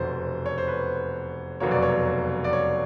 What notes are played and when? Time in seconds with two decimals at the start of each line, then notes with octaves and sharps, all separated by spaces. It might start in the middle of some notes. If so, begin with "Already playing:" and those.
Already playing: F1 E2 B2 C5
0.46 C#5
0.58 C5
0.68 B4
1.60 F1 E2 B2 F#3 A#3 C#5
1.71 D5
1.82 C#5
2.44 D5
2.53 C#5